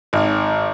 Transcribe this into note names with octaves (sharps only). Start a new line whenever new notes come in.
G#1